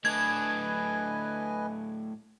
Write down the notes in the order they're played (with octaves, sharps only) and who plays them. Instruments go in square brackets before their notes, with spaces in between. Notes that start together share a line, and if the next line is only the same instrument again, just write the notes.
[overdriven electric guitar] A2 D4 [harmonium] B4 D#5 G#5 [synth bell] G#6